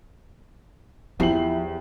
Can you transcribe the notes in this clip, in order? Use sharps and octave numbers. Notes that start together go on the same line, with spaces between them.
E2 F3 E4 G4 G5 C7 F#7